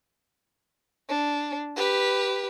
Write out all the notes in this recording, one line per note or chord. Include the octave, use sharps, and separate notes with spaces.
D4
G4 B4